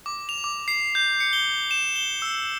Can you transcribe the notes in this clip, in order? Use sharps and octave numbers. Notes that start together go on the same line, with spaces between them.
D6
F7
D6
C7
G6
C#7
G7
E7
G7
E6